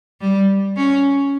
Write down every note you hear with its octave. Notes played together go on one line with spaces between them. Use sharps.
G3
C#4